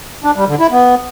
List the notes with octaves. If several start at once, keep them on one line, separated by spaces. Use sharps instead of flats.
D4
G3
D3
E4
B3